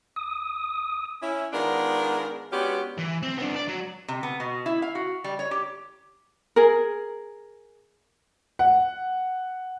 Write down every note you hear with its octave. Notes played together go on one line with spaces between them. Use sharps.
D#6
C#4 E4
D#3 G#3 B3 D4 F4 A#4
G#3 B3 C#4 D4 F#4 G4
E3
C4
B3 D4
D5
F#3
C3
B3
B2
E4
F5
F#4
G3
C#5
G4
G#4 A#4
F#5